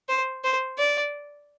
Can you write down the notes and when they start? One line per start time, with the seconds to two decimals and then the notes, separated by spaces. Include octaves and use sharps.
0.09 C5
0.44 C5
0.78 D5